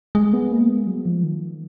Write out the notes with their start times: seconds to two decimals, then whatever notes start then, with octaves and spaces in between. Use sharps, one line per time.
0.15 G#3
0.33 B3
0.52 A#3
0.69 G#3
0.87 F#3
1.05 F3
1.24 D#3